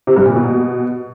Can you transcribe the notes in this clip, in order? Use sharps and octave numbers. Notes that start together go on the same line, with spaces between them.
C3
G2
A#2
B2